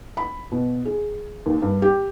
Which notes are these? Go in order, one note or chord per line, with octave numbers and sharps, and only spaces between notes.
B5
B2
G#4
D#2
G2
G4